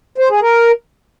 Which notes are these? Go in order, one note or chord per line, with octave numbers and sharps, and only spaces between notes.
C5
G#4
A#4